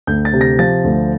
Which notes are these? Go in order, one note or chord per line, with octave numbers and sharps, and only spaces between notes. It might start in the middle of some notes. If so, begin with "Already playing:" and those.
D2 G6
A6
C3
A#6
F3 A6
D2